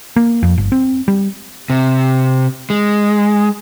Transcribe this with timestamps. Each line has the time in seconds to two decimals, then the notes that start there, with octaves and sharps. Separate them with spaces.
0.16 A#3
0.43 F2
0.58 G1
0.72 C4
1.08 G3
1.70 C3
2.70 G#3